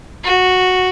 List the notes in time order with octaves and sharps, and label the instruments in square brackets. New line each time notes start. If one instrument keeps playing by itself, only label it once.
[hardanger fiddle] F#4